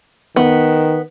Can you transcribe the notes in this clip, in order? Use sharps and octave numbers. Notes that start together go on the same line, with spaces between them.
D#3 B3